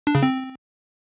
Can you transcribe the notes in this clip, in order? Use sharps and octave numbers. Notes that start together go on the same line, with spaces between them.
D4
C#3
C4